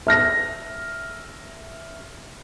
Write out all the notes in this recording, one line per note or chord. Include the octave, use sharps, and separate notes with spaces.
E5 F6 A#6